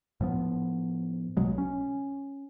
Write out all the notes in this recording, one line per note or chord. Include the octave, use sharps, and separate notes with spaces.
A2 F3 B3
B1 B2 F#3 G#3
C#4